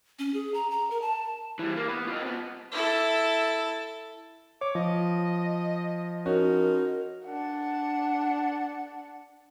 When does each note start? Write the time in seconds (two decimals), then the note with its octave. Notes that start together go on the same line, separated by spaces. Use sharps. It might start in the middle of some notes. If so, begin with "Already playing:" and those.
0.19 C#4
0.34 G#4
0.54 A#5
0.70 A#5
0.91 A#4
1.02 A5
1.59 E3 G3
1.77 A#3
1.88 B3 B4
2.07 F4 D#5
2.22 C3 B3
2.72 E4 A4
4.61 C#5 D6
4.75 F3 D#5
6.26 C#4 D#4 F#4 A#4
7.26 D4 F#5